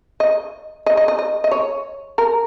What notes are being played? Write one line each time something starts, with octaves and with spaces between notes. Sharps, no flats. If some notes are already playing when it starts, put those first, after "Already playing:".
D#5
D#5
D#5
D#5
D#5
D#5
C#5
A#4